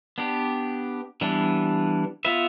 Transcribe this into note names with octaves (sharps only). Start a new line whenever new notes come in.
B3 D4 G4
E3 G3 B3 D4
B3 F4 B4 E5